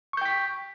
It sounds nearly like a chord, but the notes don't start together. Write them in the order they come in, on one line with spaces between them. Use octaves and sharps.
C#6 G6 G5 B6